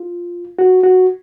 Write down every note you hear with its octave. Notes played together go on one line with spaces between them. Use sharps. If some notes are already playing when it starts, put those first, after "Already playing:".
Already playing: F4
F#4
F#4